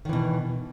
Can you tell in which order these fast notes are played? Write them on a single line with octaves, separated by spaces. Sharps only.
D#3 E3 B2